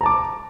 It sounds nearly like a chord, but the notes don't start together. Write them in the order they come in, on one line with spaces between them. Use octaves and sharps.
A#5 A5 D6